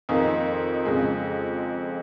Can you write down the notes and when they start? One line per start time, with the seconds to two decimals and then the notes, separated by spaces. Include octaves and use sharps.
0.09 F2 D#3 A#3 D#4 G#4
0.85 F2 C#3 G#3